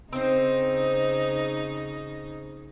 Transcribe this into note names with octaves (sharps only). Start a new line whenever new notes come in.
C#3 C4 D#4 C5